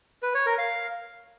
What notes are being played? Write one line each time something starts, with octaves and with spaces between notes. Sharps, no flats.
B4
C#5
A#4
F5